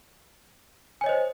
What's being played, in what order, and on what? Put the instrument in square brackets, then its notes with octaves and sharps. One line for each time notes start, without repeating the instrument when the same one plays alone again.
[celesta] G#5
C#5
D#5
C5